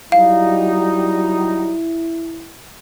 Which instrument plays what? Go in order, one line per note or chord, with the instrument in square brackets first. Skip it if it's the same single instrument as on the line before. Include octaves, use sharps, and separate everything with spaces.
[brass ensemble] F#3 G3 D#4 [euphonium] E4 [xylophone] F5